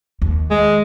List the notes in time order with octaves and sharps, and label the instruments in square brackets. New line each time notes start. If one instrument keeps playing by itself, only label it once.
[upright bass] D#2
[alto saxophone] G#3